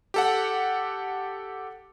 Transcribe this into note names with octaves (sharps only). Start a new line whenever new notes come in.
G4 A4 F#5